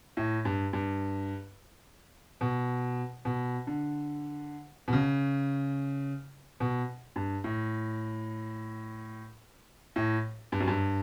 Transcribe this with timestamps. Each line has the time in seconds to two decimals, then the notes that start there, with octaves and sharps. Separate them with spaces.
0.17 A2
0.45 G2
0.73 G2
2.41 B2
3.25 B2
3.67 D3
4.88 B2
4.93 C#3
6.60 B2
7.16 G2
7.44 A2
9.96 A2
10.52 G2
10.60 F#2
10.67 G2